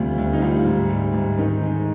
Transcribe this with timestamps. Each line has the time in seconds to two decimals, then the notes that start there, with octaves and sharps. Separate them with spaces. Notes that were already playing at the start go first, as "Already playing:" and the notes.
Already playing: D2 C3 G3 F4
0.18 D2
0.33 D#4
0.42 G3 F4
0.66 G#2
0.90 G3
1.14 G#2
1.38 D#3 D#4
1.62 G#3